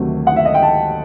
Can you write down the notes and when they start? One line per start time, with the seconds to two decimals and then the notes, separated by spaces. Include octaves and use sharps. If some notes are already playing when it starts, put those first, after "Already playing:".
Already playing: D2 C3 D#3 F#3 A3
0.27 F#5
0.36 E5
0.45 D#5
0.54 G5
0.62 A5